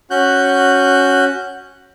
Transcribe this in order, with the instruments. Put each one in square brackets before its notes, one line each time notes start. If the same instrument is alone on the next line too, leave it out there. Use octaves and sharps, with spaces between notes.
[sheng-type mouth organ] C#4 F#4 F#6 G6